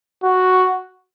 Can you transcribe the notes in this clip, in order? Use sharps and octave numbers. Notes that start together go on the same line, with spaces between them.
F#4